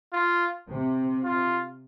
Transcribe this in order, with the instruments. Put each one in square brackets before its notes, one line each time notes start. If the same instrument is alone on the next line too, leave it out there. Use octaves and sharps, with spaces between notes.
[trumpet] F4
[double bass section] C3
[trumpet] F4